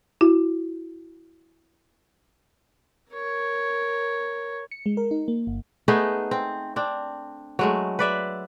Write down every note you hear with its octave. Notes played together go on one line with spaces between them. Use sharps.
E4 F#4
A#4 C#5
C#7
G#3
A#4
D#4
A#3
G1
A3 B3 D#4 G#4
C4
C4 D4
F#3 G#3 A3
B4 D5 E5